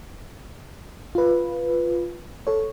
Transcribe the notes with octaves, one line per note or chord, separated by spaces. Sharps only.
F4 B4
A4 C#5